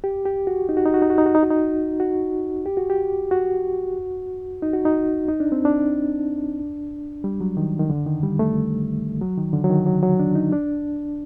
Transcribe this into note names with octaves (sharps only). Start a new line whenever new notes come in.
G4
G4
F#4
D#4
F#4
D#4
F#4
D#4
F#4
D#4
F#4
D#4
F#4
D#4
F#4
G4
F#4
G4
F#4
D#4
F#4
D#4
D#4
D4
C4
D4
G3
F#3
D#3
D#3
D3
D#3
G3
A3
F#3
D#3
D3
F#3
D#3
F#3
F#3
D4
D#4
D4